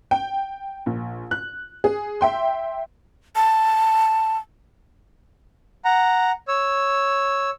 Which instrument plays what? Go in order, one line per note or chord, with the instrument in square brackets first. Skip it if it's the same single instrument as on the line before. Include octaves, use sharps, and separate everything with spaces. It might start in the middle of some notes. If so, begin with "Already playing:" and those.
[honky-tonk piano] G5
A#1
F#6
G#4
E5 G5 C6
[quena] A5
[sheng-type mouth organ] F#5 A#5
C#5 E6